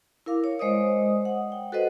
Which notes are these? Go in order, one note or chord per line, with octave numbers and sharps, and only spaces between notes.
E4 A#4 F5 D6
C#5
G#3 C5 D5 D#5 D#6
F#5
G5
F#4 A4 B4 C5 D#5 F#5